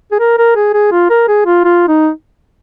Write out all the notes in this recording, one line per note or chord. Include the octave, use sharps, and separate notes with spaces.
G#4
A#4
A#4
G#4
G#4
F4
A#4
G#4
F4
F4
D#4